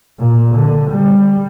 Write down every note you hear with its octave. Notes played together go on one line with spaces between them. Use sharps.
A#2
D3
G3